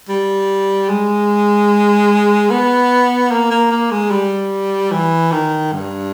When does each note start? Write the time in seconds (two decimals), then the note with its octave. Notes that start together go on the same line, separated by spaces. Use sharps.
0.09 G3
0.89 G#3
2.50 B3
3.31 A#3
3.51 A#3
3.71 A#3
3.91 G#3
4.11 G3
4.92 E3
5.32 D#3
5.73 G2